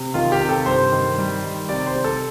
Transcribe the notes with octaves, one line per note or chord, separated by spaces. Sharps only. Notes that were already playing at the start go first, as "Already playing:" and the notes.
Already playing: C3
D#3 F4
G4
C3
A4
G2 C5
D#3
G3
D#3
C3 D5
C5
C3
A4